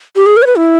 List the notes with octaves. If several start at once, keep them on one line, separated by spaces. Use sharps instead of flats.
G4
G#4
A#4
C#5
B4
E4